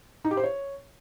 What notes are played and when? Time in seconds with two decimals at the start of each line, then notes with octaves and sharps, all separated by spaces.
0.25 D#4
0.31 G4
0.37 C5
0.43 C#5